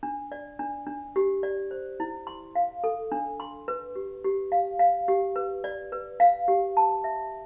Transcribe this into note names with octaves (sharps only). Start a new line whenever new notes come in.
D4
D5
D4
D4
G4
D5
C5
E4
C6
F5
A4
D4
C6
B4
G4
G4
F5
F5
G4
B4
D5
B4
F5
G4
A5
E5